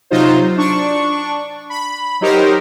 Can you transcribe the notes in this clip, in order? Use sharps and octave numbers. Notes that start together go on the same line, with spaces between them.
C3 F#3 D#4 F4 C5
D4 C#6
B5
F#3 D#4 G4 A#4 C5